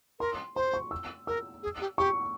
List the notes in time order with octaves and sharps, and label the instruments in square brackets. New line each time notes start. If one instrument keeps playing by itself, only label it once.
[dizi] A#4 [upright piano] C6
[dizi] C5 [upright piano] C6
[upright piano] C#6
E6
[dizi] A#4 [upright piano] E6
[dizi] G#4
G4
[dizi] G4 [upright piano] C#6